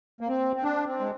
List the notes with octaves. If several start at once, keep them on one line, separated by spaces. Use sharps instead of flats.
A#3
C4
C4
D4
C4
G#3